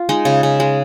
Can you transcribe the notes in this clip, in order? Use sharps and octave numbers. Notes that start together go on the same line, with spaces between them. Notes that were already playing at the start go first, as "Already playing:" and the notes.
Already playing: F4
G#3 D#4
C#3
C#3
G#3